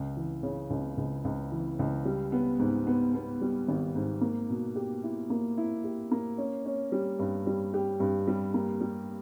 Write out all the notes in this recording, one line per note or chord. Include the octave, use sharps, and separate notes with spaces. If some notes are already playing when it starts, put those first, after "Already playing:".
Already playing: C#2
E3
C#3
C#2
C#2
C#2
E3
C#2
G3
B3
G#2
B3
B3
G3
G#1
G#2
A#3
B2
G4
E4
A#3
E4
G4
A#3
C#4
C#4
G3
G2
G3
G4
G2
G3
A#3
G3